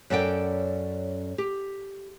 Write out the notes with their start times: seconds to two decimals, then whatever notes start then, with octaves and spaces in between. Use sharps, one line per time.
0.10 F#2 C#4 A4 D5 G5
1.38 G4